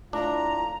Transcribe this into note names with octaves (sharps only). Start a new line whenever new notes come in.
A2 D4 F4 A#5